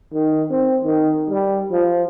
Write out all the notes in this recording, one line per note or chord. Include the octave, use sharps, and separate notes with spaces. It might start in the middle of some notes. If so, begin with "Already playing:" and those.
D#3
C4
D#3
G3
F3